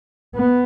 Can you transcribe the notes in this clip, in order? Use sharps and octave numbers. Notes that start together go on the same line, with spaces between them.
B3